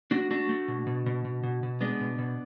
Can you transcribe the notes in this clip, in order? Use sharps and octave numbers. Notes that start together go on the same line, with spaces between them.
A3 D4 F#4
A3 D4 F#4
A3
B2
B2
B2
B2
B2
B2
G#3 B3 D4
B2
B2